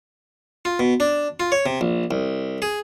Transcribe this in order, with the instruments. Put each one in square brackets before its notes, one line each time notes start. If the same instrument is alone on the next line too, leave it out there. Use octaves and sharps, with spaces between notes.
[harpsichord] F4
B2
D4
F4
C#5
C3
A#1
C2
G#4